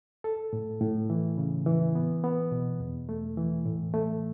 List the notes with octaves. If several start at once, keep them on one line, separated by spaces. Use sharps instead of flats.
A4
A2
A2
E3
C#3
E3
B3
B3
B2
E2
A3
E3
A2
A3